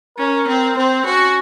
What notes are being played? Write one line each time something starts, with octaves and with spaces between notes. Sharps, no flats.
C#4 A#4
C4
C4 C5
C#4 F#4